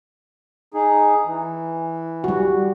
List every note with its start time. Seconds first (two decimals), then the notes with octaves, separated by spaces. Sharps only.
0.74 D#4 G#4
1.26 E3
2.24 G3 F#4